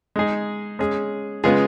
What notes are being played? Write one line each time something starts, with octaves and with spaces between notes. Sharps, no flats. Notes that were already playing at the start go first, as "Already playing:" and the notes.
G#3 D#4 G#4
G#3 C#4 G#4
C#3 G#3 B3 F4 G#4